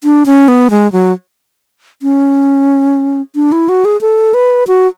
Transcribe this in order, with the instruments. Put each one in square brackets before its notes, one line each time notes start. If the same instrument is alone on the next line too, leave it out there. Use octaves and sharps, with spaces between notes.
[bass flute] D4
C#4
B3
G#3
F#3
C#4
D4
E4
F#4
G#4
A4
B4
F#4